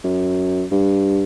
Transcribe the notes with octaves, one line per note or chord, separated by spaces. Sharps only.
F#2
G2